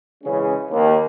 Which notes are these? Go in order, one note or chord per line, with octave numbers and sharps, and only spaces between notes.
C#3 E3 G#3 C#4
D#2